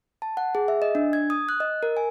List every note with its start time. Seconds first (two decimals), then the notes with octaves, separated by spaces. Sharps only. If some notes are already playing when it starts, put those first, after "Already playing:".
0.22 A5
0.37 F#5
0.55 G#4
0.68 E5
0.82 D#5
0.95 D4
1.13 G#6
1.30 D#6
1.49 F#6
1.60 D#5
1.83 A#4
1.97 G#5